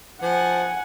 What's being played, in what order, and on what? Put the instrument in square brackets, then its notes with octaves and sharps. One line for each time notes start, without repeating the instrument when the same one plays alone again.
[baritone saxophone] F3 [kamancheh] F#5 G#5